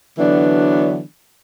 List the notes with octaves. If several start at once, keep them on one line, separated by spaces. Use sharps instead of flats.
D3 E3 F#3 B3 D4